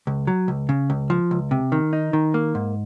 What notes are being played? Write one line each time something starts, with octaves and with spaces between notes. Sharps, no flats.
C#2
F#3
C#2
C#3
C#2
F3
C#2
C3
D#3
D#4
D#3
A#3
G#2